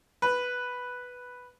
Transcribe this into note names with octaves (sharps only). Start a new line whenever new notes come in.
B4